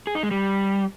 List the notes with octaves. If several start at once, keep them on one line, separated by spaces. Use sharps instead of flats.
G#4
D#4
G#3
G3